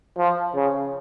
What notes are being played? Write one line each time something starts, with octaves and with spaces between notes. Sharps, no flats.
F3
C#3